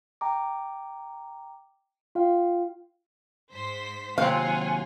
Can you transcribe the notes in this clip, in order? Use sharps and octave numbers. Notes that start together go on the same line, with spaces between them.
G5 A#5 D6
F4 F5 G5
G#2 C5 B6
D#2 C3 F#3 C4 F4 F5 F#5 G#5